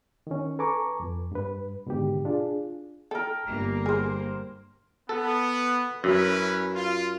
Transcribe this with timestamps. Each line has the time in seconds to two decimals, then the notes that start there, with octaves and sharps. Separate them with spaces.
0.27 D#3 C#4
0.59 A4 B4 G#5 A#5 C#6 D6
1.00 F2
1.32 G2 B4
1.87 G#2 B2 D3 D#3 G4
2.25 D4 F4 G#4
3.11 A4 A#4 G5
3.47 G1 G3 A#3
3.86 G#4 A#4 C5
5.09 B3 A4
6.04 F#2 C#4 E4 B4
6.74 F4